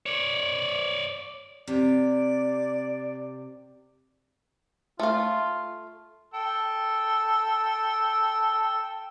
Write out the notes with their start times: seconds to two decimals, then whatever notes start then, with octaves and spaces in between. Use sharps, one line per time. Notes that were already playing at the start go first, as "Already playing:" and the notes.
0.06 C#5 D5
1.67 C3 D5
5.00 A3 F4 F5
6.34 A4 G5 E6